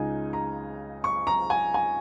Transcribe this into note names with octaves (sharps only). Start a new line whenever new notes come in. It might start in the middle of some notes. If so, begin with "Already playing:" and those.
Already playing: C#2 C#3 G#3 D#4 G#5
A#5
C#6
A#5
G#5
G#5